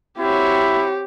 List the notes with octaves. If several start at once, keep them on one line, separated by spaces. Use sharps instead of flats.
C4 E4 F#4 G4 C#5